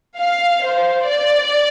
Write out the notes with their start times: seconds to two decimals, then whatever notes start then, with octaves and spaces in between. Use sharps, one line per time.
0.18 F5
0.63 C5
1.07 D5